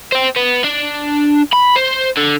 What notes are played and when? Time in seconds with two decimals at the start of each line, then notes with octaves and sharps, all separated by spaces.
0.12 C5 G5
0.36 B3
0.64 D4
1.53 B5
1.76 C5
2.17 D3